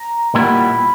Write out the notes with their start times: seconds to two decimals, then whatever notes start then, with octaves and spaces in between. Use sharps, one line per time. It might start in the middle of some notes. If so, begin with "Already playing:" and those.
Already playing: A#5
0.35 A#2 G3 B3 E4 B5